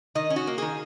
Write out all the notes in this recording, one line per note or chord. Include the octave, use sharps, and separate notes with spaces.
D#3 D#5
C#4
F#4
A#3
D#3 G#4